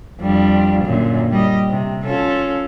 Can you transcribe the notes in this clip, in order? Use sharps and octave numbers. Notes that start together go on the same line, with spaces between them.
F2 G3 D4
F#2 A#2 D3
G3 D#5
C3
C#4 F4 A4